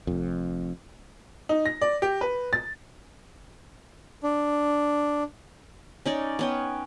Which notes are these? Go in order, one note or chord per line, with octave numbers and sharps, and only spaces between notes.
F1 F2
D#4
A#6
D5
G4
B4
A6
D4
C#4 D#4 D5
B3 C#4 G5